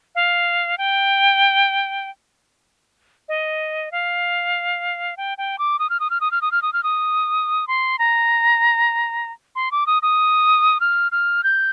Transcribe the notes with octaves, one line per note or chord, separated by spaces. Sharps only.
F5
G5
D#5
F5
G5
G5
D6
D#6
F6
D#6
F6
D#6
F6
D#6
F6
D#6
F6
D#6
C6
A#5
C6
D6
D#6
D#6
F6
F6
G6